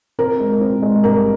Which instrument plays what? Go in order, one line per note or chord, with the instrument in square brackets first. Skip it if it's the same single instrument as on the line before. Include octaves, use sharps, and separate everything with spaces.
[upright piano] C4 [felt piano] A#4
[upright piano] G#3
C4
G#3
[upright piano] G2 [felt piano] A#4